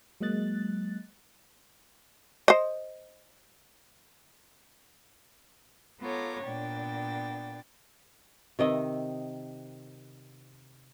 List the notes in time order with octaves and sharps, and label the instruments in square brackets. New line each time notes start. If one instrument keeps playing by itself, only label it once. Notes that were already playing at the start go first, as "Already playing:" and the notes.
[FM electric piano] F#3 G#3 A#3 D#5 F#6 A6
[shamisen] C5 D#5
[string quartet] B3 F4 A4 C#5 A#5 D6
A#2 B3 D4 G5 A6
[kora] C3 D#3 D#5 E5